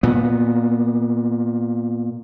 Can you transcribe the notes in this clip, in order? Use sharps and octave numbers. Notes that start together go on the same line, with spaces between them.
A#2 B3